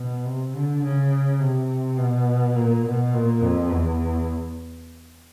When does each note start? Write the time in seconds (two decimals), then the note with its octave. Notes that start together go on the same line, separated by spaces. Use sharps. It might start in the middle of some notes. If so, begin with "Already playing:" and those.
Already playing: B2
0.26 C3
0.55 D3
0.83 C#3
1.40 C3
1.98 B2
2.55 A#2
2.85 B2
3.14 A#2
3.41 F2
3.71 E2